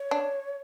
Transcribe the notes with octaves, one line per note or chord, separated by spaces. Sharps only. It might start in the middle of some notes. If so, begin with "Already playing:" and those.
Already playing: C#5
D4